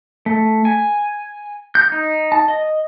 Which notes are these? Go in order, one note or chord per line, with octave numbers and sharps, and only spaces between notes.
A3
G#5
G6
D#4
A5
D#5